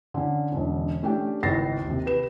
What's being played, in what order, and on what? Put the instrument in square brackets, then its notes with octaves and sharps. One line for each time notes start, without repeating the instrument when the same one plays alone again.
[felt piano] D3 C#4
E1 D3 C#4
A3 C#4 D4 G4 G5
G#1 C#2 E4 A6 A#6 C7
D#2 C3
G4 B4 E7